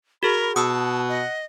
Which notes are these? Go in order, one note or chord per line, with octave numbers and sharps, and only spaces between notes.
F#4 G#4 A#4 B5
B2 F#5 A5 D#6 E6
D#5